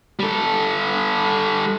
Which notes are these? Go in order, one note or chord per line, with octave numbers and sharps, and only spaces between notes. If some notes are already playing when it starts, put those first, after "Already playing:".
G3 A4